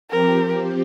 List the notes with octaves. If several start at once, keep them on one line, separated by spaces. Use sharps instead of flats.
F3 C4 G4 A#4